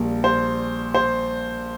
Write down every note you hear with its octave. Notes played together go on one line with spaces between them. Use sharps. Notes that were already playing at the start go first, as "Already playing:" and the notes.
Already playing: A#1 A#2 G3 A#3
C5
C5